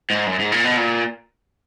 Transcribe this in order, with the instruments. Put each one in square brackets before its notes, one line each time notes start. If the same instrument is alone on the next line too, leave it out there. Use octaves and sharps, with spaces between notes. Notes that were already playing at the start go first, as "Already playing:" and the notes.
[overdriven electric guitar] G#2
F#2
G#2
A#2
B2
A#2